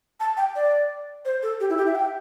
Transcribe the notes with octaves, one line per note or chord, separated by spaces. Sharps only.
A5
G5
D5
C5
A4
G4
E4
G4
E5
G5